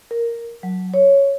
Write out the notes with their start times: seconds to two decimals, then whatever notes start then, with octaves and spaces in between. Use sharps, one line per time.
0.11 A#4
0.63 F#3
0.94 C#5